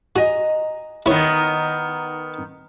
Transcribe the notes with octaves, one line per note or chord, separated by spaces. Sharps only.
F#4 D#5 G#5 A#5
D#3 B3 E4 C#5